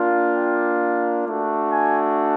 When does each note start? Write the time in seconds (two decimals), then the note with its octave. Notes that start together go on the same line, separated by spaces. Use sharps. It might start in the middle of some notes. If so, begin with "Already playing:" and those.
Already playing: A#3 D4 F4
0.33 G5
1.25 A3 D4 F#4
1.71 G#5